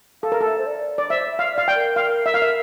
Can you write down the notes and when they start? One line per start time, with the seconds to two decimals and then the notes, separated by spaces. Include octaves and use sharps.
0.23 A4 F5
0.32 A#4
0.41 A4 E5
0.58 C5
0.66 D5
0.98 D5
1.10 C5 E5
1.31 E5
1.39 F5
1.54 D5 F5
1.68 G5
1.75 A#4
1.96 F5
2.26 E5
2.34 F5
2.42 E5